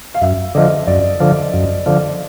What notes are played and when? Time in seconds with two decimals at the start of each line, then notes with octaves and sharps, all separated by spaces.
0.15 F5
0.21 F#2 E5
0.55 D3 F3 D#5
0.87 F#2 D5
1.20 D3 F3
1.54 F#2
1.86 D3 F3